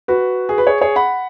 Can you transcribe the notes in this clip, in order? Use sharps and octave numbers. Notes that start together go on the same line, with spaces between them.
F#4 B4
G#4
B4
G#4 C#5
G#4 C#5
F#5 B5